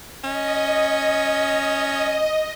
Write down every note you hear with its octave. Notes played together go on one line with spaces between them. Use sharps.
C#4 D#5